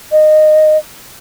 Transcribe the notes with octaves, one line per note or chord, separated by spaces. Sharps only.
D#5